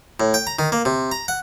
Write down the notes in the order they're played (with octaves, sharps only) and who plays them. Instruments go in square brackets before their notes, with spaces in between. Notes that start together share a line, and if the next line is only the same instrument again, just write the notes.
[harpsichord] A2
G5
A#5
D#3
A#3
C3
A#5
F#5